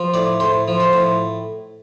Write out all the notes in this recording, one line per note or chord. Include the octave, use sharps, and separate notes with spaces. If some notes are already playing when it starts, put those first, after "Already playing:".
Already playing: F3
A2 D5
A2 C5
F3
C5
A2